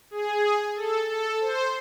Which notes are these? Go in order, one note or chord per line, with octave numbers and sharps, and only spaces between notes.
G#4
A4
A4
C5